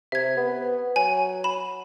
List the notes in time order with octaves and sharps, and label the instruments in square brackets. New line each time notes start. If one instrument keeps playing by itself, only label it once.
[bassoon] C3 [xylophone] E5 G#6
[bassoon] B3
[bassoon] F#3 [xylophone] G#5
[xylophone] B5 E7